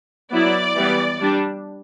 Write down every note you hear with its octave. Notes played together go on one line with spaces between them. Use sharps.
F#3 B3 E4 D5
E3 G3 B3
G3 D4